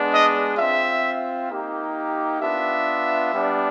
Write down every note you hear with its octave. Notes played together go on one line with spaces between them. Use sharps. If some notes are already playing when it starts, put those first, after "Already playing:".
Already playing: G#3 B3 D4
D#5
C4 F4 E5
A#3 D#4 G4
B3 D4 F4 E5
G3 B3 D4